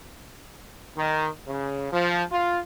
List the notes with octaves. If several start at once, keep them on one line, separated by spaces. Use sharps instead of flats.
D#3
C#3
F3
F4